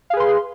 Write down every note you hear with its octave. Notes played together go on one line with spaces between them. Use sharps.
G#4 B4 F5 C6